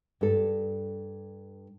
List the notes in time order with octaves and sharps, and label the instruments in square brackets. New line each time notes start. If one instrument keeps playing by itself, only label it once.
[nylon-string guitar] G2 A4